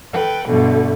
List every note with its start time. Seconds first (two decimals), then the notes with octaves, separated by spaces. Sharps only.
0.12 A4 B4 G5
0.47 G2 B2 D3 A3